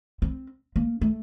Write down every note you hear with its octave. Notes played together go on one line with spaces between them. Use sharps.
C4
A#3
A3